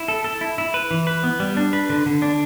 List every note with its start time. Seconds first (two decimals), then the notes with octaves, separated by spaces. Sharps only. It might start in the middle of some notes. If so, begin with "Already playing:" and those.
Already playing: E4
0.08 A4
0.24 A4
0.41 E4
0.58 E4
0.74 B4
0.91 E3
1.07 B4
1.23 B3
1.40 G3
1.57 D4
1.73 B4
1.90 D3
2.06 D3
2.22 D4